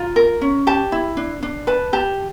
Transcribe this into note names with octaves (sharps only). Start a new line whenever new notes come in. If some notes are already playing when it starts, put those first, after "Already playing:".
Already playing: F4 A#5
A#4
C#4
G4 A5
E4
D4
D4
B4 A5
G4 A5